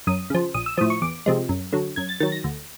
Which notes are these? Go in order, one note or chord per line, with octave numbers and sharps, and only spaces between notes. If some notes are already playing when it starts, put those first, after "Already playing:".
F#2 D#6
C#3 F3
A#1 D#6
E6
A2 F3 D#6
C#6
E2 D6
C3 F3 G#3
F#2
D3 F#3
F#2 G#6
A6
D#3 F#3 A6
A#6
D2